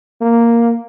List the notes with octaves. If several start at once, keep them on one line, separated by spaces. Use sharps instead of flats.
A#3